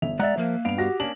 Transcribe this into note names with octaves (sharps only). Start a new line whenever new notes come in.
G1 E5 F7
G#3 D5 E5 F#5 A#5 F#6
F3 A#3 A#4
G2 B3 F5 D7 F7
F#4 G4 A#6
A#3 C#4 D4 F#7